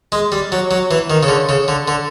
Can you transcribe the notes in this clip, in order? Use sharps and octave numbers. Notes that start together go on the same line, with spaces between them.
G#3
G3
F#3
F#3
E3
D#3
C#3
D3
C#3
D3
D3